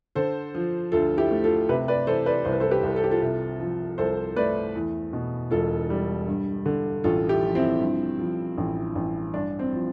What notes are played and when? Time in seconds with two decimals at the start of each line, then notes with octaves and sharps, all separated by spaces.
0.15 D3 A4 C5
0.55 F3
0.92 D2 F4 A4
1.17 E4 G4
1.31 A3
1.44 F4 A4
1.69 C3 G4 B4
1.88 B4 D5
2.07 E3 A4 C5
2.26 B4 D5
2.45 C2 C5
2.53 B4
2.60 A4 C5
2.71 G4 B4
2.83 C2
2.96 A4
3.04 G4
3.11 F4 A4
3.22 C3
3.60 F3
3.98 C2 A4 C5
4.36 A3 B4 D5
4.75 E2
5.13 B2
5.51 E1 F4 A4
5.90 G3
6.27 G2
6.66 D3
7.04 A1 F4 A4
7.29 E4 G4
7.43 F3
7.55 C4 E4
7.81 G2
8.19 F3
8.58 A1
8.95 A1
9.33 G2 D4
9.59 C4
9.73 F3